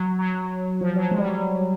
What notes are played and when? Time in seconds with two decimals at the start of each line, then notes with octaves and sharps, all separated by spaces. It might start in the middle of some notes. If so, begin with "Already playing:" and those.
Already playing: F#3
0.19 F#3
0.81 F3
0.95 F#3
1.11 G#3
1.18 G3
1.25 F#3
1.32 G3